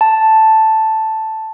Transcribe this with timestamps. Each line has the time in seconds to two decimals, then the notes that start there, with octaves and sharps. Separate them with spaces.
0.01 A5